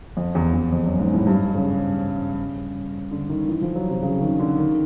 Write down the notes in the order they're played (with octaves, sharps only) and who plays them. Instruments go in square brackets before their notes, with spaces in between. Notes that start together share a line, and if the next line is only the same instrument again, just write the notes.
[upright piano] F2
E2
E2
F2
F#2
G#2
A2
G2
C#3
D3
D#3
E3
F3
F#3
C3
C#3
D#3
D3
D#3